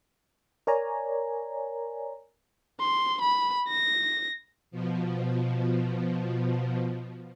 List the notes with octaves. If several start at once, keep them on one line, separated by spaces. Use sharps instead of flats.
A#4 C#5 D5 G#5 A#5
C6
B5
A#6
B2 F3